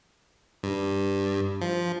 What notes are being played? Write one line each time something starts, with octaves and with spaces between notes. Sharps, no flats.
G2
F3